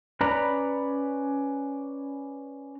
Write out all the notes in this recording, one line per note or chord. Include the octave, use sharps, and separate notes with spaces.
C#4 B4 D5 A#5 B5